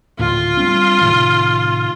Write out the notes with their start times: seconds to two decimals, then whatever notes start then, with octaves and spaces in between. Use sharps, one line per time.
0.19 D2 A2 F4
0.57 G3 C4 D4
1.01 A2 C3 D#3